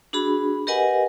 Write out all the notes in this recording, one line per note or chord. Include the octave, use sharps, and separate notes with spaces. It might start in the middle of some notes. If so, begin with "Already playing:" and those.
D4 F#4 G#4 B5
G4 A#4 B4 D#5 F#5 G#5